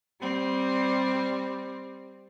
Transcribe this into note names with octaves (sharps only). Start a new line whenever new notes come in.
G3 C4